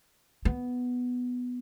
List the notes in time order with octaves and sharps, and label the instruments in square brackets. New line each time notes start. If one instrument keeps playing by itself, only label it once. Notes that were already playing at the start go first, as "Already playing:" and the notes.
[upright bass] B3